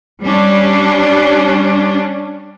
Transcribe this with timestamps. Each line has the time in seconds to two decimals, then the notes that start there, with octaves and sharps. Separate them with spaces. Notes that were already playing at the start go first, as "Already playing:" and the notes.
0.23 G3 C#4 D4